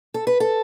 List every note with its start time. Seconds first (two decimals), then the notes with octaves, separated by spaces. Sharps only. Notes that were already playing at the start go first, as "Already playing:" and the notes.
0.14 A4
0.27 B4
0.40 A4